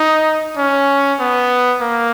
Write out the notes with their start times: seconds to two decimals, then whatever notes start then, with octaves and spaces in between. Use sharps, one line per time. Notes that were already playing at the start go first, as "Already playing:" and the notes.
Already playing: D#4
0.57 C#4
1.20 B3
1.82 A#3